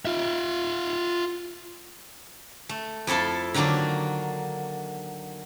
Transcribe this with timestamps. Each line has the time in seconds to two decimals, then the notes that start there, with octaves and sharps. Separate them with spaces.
0.05 F4 E5
2.69 A3
3.07 F2 E4 A4 F5 A5
3.54 D3 D#3 F#3 A#3 D4